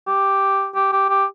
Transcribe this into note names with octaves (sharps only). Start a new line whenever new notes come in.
G4
G4
G4
G4